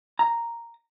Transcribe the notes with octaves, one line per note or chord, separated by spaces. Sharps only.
A#5